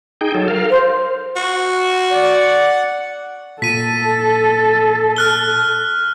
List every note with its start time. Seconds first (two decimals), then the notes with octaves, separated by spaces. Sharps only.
0.21 D#4 G#4 G5
0.34 F#3 A4
0.48 A#4 F5
0.70 C5
1.36 F#4
2.11 D5 F#5
3.62 A#2 A4 B6 D#7
5.16 F6 F#6 G7